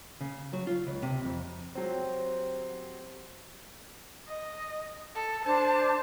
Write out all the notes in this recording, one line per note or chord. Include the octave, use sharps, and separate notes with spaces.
C#3
F#3
F4
C#2
C3
F2
F#3 C4 G4 C5 C6
D#5
A4
D4 C5 A5 G6